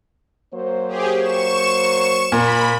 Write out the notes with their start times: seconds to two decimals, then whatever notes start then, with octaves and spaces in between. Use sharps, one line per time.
0.53 F#3 A#3 C5
0.88 G4 G#4
1.20 C#6 E7
2.32 A#2 B5